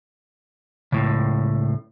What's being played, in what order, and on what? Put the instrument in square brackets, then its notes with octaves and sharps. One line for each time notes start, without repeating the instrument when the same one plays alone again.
[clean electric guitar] C#2 A2 C#3